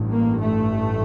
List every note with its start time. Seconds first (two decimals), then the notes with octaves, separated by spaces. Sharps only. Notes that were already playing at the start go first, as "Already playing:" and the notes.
Already playing: A1 G2
0.10 A#3
0.40 A3